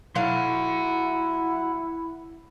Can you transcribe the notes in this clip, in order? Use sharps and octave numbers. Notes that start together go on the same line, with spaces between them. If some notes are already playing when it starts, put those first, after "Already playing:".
F#3 E4 F5 F#5 C6